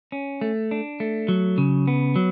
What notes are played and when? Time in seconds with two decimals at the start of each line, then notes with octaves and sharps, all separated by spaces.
0.12 C#4
0.41 A3
0.71 D4
1.00 A3
1.28 F#3
1.58 C#3
1.88 B3
2.16 F#3